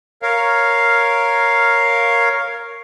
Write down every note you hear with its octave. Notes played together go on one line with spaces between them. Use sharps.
A#4 C#5 F5